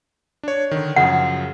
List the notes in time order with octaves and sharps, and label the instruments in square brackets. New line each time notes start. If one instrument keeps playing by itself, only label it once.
[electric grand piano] D4 C#5
D3 D#3
[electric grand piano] F#2 C#3 F3 [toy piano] F#5